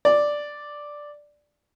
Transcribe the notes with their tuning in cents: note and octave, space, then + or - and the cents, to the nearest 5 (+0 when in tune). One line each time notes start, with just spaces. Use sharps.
D5 +0